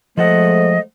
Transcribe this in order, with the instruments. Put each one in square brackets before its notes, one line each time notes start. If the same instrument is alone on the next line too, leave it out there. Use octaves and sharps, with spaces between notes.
[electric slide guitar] F3 A4 F#5 [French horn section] G#3 A3 C5 [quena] D#5